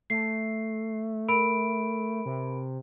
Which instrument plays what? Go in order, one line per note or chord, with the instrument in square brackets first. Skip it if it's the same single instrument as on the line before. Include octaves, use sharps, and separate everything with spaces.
[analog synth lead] A3 [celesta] C7
[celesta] A#4 B5 D7
[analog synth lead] C3